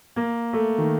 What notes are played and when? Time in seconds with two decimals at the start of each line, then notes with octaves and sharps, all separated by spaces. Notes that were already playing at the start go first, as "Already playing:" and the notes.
0.16 A#3
0.53 A3
0.78 D#3